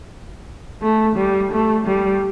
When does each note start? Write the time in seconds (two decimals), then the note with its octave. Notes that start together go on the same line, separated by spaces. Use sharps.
0.82 A3
1.16 G3
1.52 A3
1.86 G3